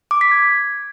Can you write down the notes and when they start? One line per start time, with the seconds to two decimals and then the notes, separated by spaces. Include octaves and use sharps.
0.11 D6
0.21 B6
0.31 G#6